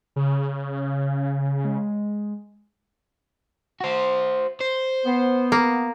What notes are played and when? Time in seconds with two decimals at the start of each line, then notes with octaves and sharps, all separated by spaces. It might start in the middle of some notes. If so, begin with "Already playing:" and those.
0.16 C#3
1.64 G#3
3.80 F#4 C5
4.60 C5
5.06 B3
5.52 A#3